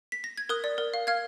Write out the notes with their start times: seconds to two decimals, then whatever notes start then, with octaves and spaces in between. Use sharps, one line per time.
0.12 B6
0.24 A#6
0.37 G#6
0.49 A#4 D#6 F#6
0.64 D5
0.78 A#4
0.94 F5
1.07 F5 F6 G#6